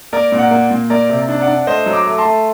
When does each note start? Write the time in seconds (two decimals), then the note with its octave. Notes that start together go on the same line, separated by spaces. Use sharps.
0.13 A#3 A#4 D5
0.32 A#2
0.38 D5 F#5
0.51 A#3
0.70 A#2
0.90 A#3 A#4 D5
1.09 C3
1.29 D4
1.41 D5 F#5
1.48 D4
1.67 A3 C5 D#5
1.86 F#3
1.93 A#5 D6
2.06 A3
2.18 A5 C6
2.25 A3